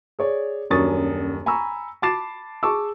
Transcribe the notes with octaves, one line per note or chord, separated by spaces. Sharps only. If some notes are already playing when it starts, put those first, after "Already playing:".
G#4 C#5 D5
D#1 F#2 D4 C#6 D#6 A6
G#5 A#5 B5 C#6 E6
A5 B5 D6 A6 C7 E7
G#4 A5 C#6 D6 E6